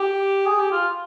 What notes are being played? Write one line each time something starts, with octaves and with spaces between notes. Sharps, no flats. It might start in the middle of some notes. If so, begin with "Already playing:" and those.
Already playing: G4
G#4
G4
F4